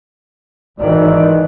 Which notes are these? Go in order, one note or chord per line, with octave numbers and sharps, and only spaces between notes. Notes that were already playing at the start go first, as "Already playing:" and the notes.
G#1 D#3 E3 D5